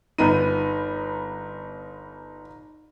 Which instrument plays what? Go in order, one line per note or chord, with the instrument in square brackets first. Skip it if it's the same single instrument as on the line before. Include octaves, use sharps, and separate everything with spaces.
[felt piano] G1 B3 D#7 [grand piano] D#4